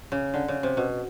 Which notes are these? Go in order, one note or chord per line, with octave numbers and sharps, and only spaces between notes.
C#3
D3
C#3
C3
B2